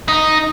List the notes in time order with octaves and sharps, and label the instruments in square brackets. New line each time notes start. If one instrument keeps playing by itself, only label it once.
[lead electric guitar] D#4